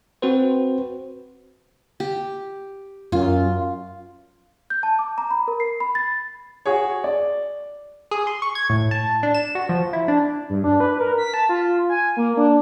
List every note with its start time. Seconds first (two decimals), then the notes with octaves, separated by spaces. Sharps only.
0.22 C4 F#4 B4 C5
2.00 G4
3.12 F#2 F4
4.70 G6
4.83 A5
4.99 D6
5.18 A#5
5.31 B5
5.48 A#4
5.60 C7
5.80 B5
5.95 A6
6.66 F#4 G#4 C#5
7.04 D5
8.11 G#4
8.27 C6
8.42 C#6
8.55 G#6
8.69 A2
8.91 A5
9.23 D4
9.34 E7
9.55 F#4
9.69 F3
9.93 E4
10.08 D4
10.49 G2
10.64 D4
10.80 B4
11.00 A#4
11.18 B6
11.34 A5
11.49 F4
11.89 G#5
12.17 A#3
12.37 D4